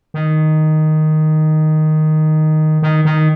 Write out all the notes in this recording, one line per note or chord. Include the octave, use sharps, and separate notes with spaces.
D#3
D#3
D#3